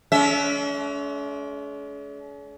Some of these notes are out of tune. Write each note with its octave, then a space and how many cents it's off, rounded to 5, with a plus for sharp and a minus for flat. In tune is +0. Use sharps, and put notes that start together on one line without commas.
G#3 +45 C#4 +45 E5 +0